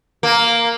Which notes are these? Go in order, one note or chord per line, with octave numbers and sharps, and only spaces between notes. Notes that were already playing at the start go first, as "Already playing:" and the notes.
A#3